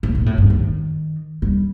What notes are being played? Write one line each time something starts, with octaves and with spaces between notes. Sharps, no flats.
A2
A#2
A2
G2
D#3
G3